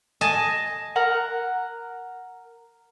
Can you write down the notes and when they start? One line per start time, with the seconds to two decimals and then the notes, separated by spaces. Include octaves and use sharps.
0.21 D#5 G#5 A5
0.96 A#4 F#5 A#5